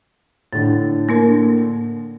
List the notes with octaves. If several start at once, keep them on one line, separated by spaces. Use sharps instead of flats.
A2 D3 A6
A#3 D4 A#4